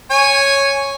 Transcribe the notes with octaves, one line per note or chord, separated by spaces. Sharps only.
C#5 G#5